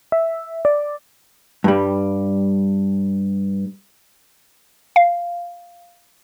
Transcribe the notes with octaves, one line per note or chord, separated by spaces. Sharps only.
E5
D5
G2 G3
F5